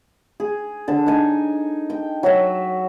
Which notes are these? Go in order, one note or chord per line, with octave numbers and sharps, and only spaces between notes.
G#4
D3 A5
D#4 G#5
G5
F#3 F#4 E5